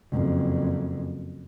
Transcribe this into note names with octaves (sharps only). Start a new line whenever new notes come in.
F#1 F2